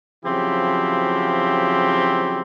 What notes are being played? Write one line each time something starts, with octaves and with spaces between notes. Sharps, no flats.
C#3 F3 F#3 C4 E4 G4